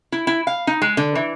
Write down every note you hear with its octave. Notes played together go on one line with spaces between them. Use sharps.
E4
E4
F5
D#4
G#3
D3
E3